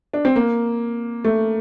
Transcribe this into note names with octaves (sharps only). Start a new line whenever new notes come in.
D4
C4
A#3
A3